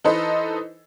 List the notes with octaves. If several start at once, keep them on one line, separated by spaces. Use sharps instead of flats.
E3 D#4 A4 B4 C5 D#5